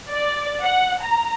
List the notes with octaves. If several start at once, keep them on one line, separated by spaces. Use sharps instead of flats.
D5
F#5
A#5